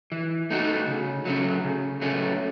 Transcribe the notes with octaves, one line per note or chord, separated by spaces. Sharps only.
E3
A3 D#4 F#4
C#3
F#3 A3 C#4
C#3
F#3 A3 C#4